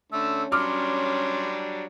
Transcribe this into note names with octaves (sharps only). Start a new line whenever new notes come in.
D3 A3 C#4 E6
F#3 G3 D4 C6 D6 F6